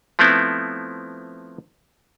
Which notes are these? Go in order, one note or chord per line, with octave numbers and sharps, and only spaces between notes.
F3 A3 B3 C4 E4